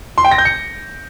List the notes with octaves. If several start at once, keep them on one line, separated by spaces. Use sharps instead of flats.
C6
G5
A#6
G6
C#7